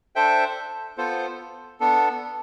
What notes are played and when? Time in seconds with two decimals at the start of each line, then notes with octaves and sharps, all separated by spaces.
0.15 D4 A4 C5 E5 G5
0.98 B3 F4 A4 C5
1.80 B3 D4 A4